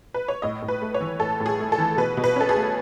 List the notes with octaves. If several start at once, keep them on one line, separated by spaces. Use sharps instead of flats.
B4
C#5
A2 D#5
A2
B4
A3
C#5
E3
A2 A4
A2
G#4
A3
A4
E3
B2 B4
B2
B4
C#4 A4
G#4
A3